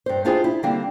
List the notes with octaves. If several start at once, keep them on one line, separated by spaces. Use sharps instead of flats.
G2 C5
D4 E4 F4 G4 G#4 C5
E4
D3 G3 A#3 C4